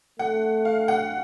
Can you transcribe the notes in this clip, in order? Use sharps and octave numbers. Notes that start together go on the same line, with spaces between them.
A3 F#5
F5
F#5